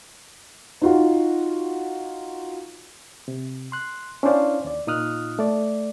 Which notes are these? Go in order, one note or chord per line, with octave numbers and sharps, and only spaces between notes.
D#4 F4 F#4
C3
C6 F#6
C#4 D4 E4 C5 D5 F5
D#2 D5
A#2 D#4 F4 D#6 F6 F#6
A3 D5